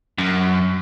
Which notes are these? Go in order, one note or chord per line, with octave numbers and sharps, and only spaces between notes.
F#2